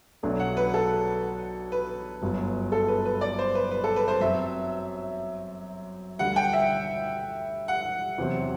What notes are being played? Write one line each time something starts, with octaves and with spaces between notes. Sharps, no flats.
B1 B2 F#3 A3 D4
F#5
B4
A4
B4
G1 F#2 F#3
A4
B4
B4
D5
C5
B4
B4
A4
B4
C5
F#2 F#3 C4 E5
D2 D3 G3 F#5
G5
E5
F#5
E2 C3 F#3 C4